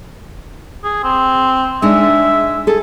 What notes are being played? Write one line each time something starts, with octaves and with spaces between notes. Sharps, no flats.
G#4
C4
G#3 D4 D#4 E5
G#4 A4